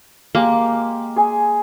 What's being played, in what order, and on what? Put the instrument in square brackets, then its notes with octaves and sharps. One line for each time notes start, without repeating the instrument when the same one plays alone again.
[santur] G#3 G4 [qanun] A#3
[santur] G#4 G#5